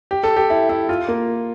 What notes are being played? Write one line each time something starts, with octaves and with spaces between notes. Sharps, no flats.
G4
A4
G4
E4
E4
F4
A#3